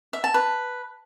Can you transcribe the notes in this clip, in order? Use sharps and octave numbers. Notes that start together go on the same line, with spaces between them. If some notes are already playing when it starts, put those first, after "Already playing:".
E5
A5
B4